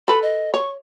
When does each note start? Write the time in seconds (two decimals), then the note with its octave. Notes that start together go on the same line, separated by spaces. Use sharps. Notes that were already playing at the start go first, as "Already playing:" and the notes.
0.08 A4 B4 B5
0.23 D#5
0.54 C#5 C#6